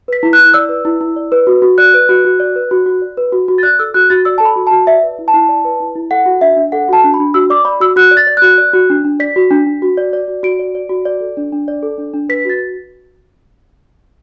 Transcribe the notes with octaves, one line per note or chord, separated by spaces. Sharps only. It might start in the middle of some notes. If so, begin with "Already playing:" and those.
B4 B6
E4
F#6
E4
D5 E6
B4
E4
E4
D5
B4
F#4
F#4
D5 F#6
B4
F#4
F#4
D5
B4
F#4
F#4
D5
B4
F#4
F#4
A6
D5 F#6
A4 E6
F#4 F#6
F#4 A6
D5 E6
A4 A5
B5
F#4
F#4 A5
D5 E5
B4
E4
A5
E4
D5
B4
E4
E4
A4 F#5
F#4
D4 E5
D4
A4 F#5
F#4 A5
D4
B5
D4
F#4 E6
D5 D6
D5 B5
F#4 E6
F#4 F#6
D5
A6
D5
F#4 F#6
D5
F#4
D4
D4
D5 B6
F#4
D4
D4
F#4
D5
D5
F#4
F#4 D7
D5
D5
F#4
D5
A4
D4
D4
D5
A4
D4
D4
B4 B6
F#4 A6